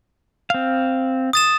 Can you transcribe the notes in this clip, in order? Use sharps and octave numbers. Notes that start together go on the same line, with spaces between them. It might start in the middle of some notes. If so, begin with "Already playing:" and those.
C4 F5
D#6 A6 E7